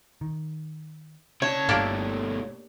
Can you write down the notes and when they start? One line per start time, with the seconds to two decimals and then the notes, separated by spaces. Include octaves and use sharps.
0.21 D#3
1.42 C#3 C#5 A5
1.69 G1 G2 B2 A3 A#3 D4 G4